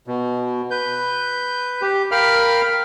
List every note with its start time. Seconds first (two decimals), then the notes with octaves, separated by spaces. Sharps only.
0.07 B2
0.71 B4 G6
1.82 G4
2.11 A#4 F5 G5 B5 F6